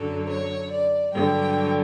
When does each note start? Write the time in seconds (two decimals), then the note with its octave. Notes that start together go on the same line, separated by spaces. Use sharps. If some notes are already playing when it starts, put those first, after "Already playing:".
Already playing: F#2 D3 F#3 A4
0.28 C#5
0.70 D5
1.12 G2 D3 F#3 G5
1.40 G5